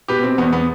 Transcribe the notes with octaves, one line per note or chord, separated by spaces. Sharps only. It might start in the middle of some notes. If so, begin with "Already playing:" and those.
B2 G4 B4
C4
E2 B3
B3